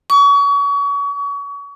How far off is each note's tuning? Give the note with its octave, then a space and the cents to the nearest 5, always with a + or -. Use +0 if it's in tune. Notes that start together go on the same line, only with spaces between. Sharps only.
C#6 +35